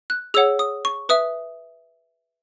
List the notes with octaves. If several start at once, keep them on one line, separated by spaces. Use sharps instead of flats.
F#6
G#4 C#5 F#5 E6
D#6
C#6
B4 E5 D#6